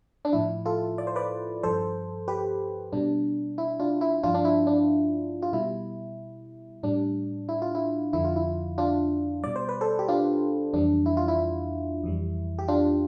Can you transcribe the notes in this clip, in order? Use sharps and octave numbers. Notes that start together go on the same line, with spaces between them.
D4
A2 F3 E4
F4 A4
D5
C5
B4 D5
G2 F3 A4 C5
G4 B4
B2 G3 D4
E4
D4 F4
E4
G2 F3 D4 F4
D4
E4
D4
F4
B2 G3 E4
A2 G3 D4
E4
F4
E4
F2 D3 F3 E4
F4
E4
D4 F4
B2 G3 D5
C5
B4
A4 C5
G4
D4 F4
F2 E3 G3 D4
E4
F4
E4
F2 E3 G3
G4
D4 F4